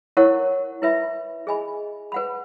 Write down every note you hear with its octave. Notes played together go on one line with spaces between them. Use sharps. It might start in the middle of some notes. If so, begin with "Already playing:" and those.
E4 A#4 C#5 F#5 C#6
E4 B4 E5 B5
G#4 D#5 G#5 B5
B4 F#5 B5